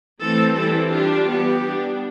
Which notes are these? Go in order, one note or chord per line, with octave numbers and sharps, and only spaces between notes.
E3 A3 C4 A4
E3 G3 C4 E4 A4
G3 D4 F4 G4
E3 G3 B3 G4
G3 B3 D4